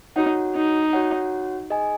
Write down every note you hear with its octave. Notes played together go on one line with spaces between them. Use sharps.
D#4 F#4 C#5 F#5
D#4
F#4 C#5 F#5
G#4 D#5 G#5